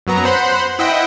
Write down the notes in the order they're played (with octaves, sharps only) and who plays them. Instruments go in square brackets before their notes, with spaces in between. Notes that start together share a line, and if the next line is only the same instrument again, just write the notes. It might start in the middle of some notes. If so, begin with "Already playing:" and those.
[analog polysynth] F#2 F#3 B3 A#5
C5 F#5 B5 C6
E4 D#5 E5 F#5 G5